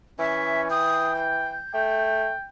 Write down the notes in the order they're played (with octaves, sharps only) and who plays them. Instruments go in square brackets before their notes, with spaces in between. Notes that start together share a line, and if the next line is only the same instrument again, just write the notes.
[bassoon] E3 [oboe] C#4 [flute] E5
[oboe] G5 [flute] D#6
[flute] G6
[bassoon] A3 [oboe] G5